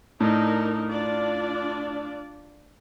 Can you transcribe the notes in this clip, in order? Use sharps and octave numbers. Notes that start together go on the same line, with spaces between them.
A2 D4 D#4 A#4
D4 F4 D5